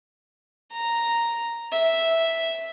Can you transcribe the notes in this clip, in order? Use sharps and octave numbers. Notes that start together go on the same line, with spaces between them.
A#5
E5